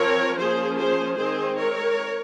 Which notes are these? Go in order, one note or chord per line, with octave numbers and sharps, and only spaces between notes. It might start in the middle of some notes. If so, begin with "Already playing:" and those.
Already playing: F3 C4 A#4 C#5
F3 A#3 C#4 G#4 C5
G#4 C5
D#3 G#3 C4 G#4 C5
A#4 C#5